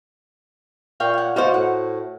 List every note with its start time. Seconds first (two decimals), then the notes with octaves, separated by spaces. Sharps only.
1.00 A#2 F5 G5 C#6
1.13 C#5 F#5
1.36 D#4 F#4 C5 D5 F5
1.54 A2 F#5